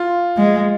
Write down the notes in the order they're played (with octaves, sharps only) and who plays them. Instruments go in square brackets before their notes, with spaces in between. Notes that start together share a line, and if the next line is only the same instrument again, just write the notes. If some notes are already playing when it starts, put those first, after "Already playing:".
Already playing: [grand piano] F4
[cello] G#3